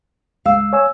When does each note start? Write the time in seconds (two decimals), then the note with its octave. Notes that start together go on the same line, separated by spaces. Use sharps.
0.46 C#2 G#3 F5 E6
0.73 C#5 G#5 E6